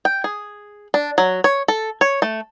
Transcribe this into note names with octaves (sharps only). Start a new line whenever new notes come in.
G5
G#4
D4
F#3
C#5
A4
C#5
A3